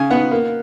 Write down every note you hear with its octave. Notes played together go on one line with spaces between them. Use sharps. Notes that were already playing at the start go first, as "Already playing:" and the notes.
Already playing: C#3 G#5
B3 F#5
A#3